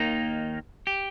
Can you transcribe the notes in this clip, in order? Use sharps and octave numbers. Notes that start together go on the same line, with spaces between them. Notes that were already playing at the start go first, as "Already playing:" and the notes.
Already playing: D#2 D#3 A#3 D#4
G4